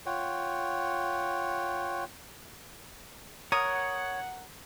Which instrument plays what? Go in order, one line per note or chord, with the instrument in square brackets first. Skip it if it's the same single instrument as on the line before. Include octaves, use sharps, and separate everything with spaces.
[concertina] F4 C#5 F#5 G5
[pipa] A#4 [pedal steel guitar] C#5 [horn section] F#5 [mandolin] D#6